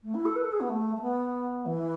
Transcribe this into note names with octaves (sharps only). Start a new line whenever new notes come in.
A3
E4
A4
B4
A4
G#4
B3
A3
A3
B3
E3